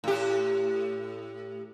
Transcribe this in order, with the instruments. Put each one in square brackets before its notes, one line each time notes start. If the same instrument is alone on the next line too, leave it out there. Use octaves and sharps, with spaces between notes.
[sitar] A2 G4